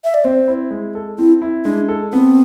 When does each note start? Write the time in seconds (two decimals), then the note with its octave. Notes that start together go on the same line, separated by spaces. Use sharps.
0.04 E5
0.14 D5
0.24 C4 C5
0.48 E4
0.71 G#3
0.95 A4
1.18 C4 E4
1.42 E4
1.65 G#3 D4
1.88 A4
2.13 B3 C4